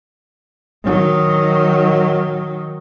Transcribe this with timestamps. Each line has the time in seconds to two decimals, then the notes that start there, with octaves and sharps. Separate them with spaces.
0.84 D#3 F#3